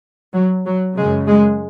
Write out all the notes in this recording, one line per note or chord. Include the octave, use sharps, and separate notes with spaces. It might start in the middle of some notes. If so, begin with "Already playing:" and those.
F#3
F#3
F#2 C#3 G#3
G#3